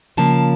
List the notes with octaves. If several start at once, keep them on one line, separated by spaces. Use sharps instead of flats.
C#3 F3 A#3 A5